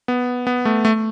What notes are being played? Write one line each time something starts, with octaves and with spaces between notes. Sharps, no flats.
B3
B3
A3
A3